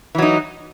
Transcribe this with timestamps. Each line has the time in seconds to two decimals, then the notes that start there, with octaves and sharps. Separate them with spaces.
0.15 E3
0.18 F#3
0.22 D#4